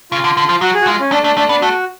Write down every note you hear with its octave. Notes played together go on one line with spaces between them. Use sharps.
C#3 F4
D3
D3
F3
F#3 F#4
G#4
F#4
G#3 F4
C#4
A3 D4
A3 D4
A3 D4
B3 D4
A3 F#4